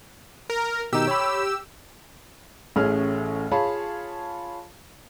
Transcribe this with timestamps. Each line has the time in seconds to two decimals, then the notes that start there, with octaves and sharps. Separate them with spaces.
0.50 A#4
0.93 B2 D#3 D#4 G4 E6
1.07 C#5 B5
2.76 A1 A2 A3 C#4 G#4 F6
3.51 F4 G#4 C#5 F5 A5 B5